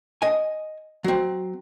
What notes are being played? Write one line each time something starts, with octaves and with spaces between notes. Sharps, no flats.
D#5 G#5
F#3 C4